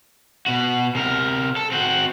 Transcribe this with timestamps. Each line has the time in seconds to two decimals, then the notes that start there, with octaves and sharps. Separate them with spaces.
0.46 B2 F#4
0.95 C3 A#4
1.57 A4
1.72 C4 F#4